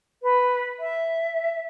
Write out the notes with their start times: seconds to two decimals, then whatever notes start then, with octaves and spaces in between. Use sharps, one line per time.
0.23 B4
0.80 E5